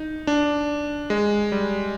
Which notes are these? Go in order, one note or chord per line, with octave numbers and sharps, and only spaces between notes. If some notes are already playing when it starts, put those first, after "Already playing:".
Already playing: D#4
D4
G#3
G3